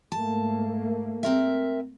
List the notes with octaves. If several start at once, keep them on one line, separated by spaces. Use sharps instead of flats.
G#2 A3 A#3 A5
C4 A#4 E5